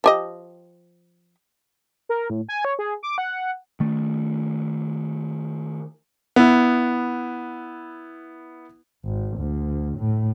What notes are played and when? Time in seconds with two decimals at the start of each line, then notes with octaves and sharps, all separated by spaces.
0.04 F3 G4 D#5
2.09 A#4
2.30 A2
2.49 G#5
2.65 C#5
2.79 G#4
3.03 D6
3.18 F#5
3.80 D#3 A3
6.36 B3 E4
9.04 G#1
9.37 D2
9.97 A2